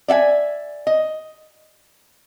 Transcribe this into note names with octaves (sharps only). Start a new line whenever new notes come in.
D5 E5 F#5 G#5
D#5